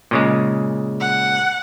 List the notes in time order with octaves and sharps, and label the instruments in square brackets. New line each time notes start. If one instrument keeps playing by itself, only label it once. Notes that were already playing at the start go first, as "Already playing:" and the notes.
[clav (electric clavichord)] A#2 C#3 G#3
[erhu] F#5